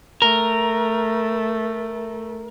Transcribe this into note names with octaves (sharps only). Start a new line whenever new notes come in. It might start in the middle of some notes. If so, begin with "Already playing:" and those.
A3 A#4